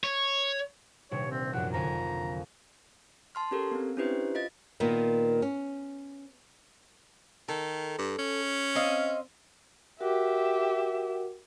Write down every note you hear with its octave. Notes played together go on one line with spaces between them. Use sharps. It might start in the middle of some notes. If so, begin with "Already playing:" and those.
C#5
D#1 C3 D4 C#5
C4
A#1 F#2 F#5
F2 D3 G#5 A#5
A5 C6 F6
C#4 G4 A4 A#4
B3 C4
C#4 D4 E4 G4 B4 C5
F4 D#5 A6
A#2 D#3 A#3 B3
C#4
D#3 A4
G2
C#4
C4 D#5 F5
F#4 G4 A#4 E5 F#5